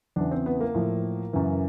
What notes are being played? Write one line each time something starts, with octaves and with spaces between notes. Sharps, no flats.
E2 C#3 E3 D4
C4
B3
A#3
A2 F3
F#2 C#3 E3